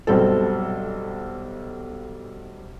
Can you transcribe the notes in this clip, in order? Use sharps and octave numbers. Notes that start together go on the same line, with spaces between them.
B1 G2 C4 A4